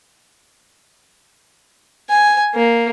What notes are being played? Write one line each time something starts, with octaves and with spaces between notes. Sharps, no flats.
G#5
A#3